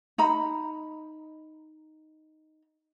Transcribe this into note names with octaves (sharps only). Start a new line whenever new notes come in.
D#4 A#5 B5